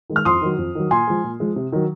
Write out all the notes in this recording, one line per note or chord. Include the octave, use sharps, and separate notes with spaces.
D#3 G#3
F6
F2 C6 D#6
D#3 F#3
F2
D#3 F#3
A#2 G#5 C6
F3 G#3
A#2
F3 G#3
C3
D#3 F#3